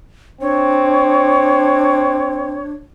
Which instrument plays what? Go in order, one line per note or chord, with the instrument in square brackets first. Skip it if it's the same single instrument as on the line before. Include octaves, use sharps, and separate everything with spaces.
[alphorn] C4 [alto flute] D4 [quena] C#5